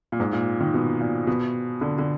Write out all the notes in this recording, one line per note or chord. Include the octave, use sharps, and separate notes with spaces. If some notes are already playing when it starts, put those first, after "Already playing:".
A#2
G#2
A#2
D#3
B2
A#2
B2
D3
D3